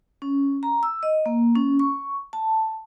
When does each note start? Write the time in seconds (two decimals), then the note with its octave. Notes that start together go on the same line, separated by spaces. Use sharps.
0.22 C#4
0.63 A#5
0.83 E6
1.03 D#5
1.26 A#3
1.56 C#4
1.79 C#6
2.33 A5